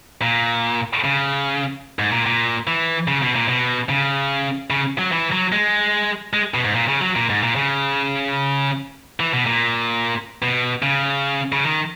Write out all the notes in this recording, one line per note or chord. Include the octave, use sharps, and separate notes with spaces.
A#2
C#3
G#2
A#2
A#2
E3
C#3
B2
A#2
B2
C#3
C#3
F#3
E3
F#3
G#3
G#3
B2
G#2
A#2
C#3
F#3
A#2
G#2
A#2
C#3
E3
B2
A#2
B2
C#3
C#3
D#3